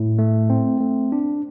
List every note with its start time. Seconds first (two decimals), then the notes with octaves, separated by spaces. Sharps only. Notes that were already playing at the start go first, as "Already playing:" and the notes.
Already playing: A2
0.19 A3
0.50 C4
0.80 A3
1.12 D4